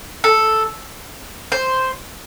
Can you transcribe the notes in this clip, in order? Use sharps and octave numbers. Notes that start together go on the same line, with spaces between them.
A4
C5